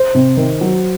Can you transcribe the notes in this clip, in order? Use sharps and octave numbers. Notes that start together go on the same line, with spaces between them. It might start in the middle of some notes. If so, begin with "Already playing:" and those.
Already playing: C5
C3
D#3
F#3